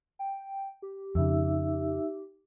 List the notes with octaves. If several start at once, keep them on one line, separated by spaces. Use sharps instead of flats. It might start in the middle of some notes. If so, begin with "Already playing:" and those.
G5
G4
F2 C#3 D#4 E5 E6